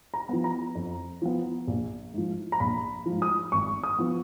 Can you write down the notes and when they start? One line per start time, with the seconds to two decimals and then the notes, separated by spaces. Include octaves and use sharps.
0.14 A#5
0.29 F3 B3
0.44 A#5
0.75 F2
1.22 F3 B3
1.67 A#1
2.13 G#2 F3
2.52 A#5
2.60 A#1 B5
3.06 G#2 F3
3.22 D#6
3.52 G#1 C#6
3.84 D#6
3.99 F3 B3